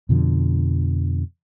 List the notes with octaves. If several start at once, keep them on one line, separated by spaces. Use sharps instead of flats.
F2 B2 D3 F3